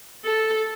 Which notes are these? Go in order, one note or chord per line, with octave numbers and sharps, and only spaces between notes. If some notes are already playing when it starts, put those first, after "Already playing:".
A4